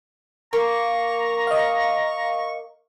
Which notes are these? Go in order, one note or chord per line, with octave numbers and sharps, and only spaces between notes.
A#3 A#5 C#6
D#5 F5